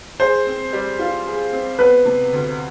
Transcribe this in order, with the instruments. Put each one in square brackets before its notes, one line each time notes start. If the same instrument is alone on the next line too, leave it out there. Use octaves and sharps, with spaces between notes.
[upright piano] G#4 [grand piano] C5
[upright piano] C4
G3
F4
G#4
C4
[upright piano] B3 [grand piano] B4
[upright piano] C3
D2